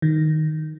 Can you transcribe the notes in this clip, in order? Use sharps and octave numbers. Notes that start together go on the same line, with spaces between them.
D#3